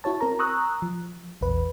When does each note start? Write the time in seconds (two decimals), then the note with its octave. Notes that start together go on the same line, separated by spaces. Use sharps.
0.04 E4 F#4 C#5 A5
0.21 C4 A#4 A#5
0.39 A#5 C#6 D#6 E6 F#6
0.82 F3
1.41 A#1 E2 B4